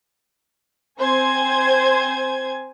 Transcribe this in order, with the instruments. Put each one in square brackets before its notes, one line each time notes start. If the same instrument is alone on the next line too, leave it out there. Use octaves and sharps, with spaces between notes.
[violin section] C4 C5 G#5 G#6